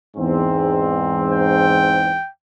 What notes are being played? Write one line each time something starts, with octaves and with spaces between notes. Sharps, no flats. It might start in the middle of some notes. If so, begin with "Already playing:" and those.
E2 G#2 C4
G5